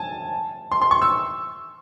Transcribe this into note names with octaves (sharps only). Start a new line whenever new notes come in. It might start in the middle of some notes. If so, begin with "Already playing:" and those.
Already playing: G#5 A5
C6
C6
C#6
E6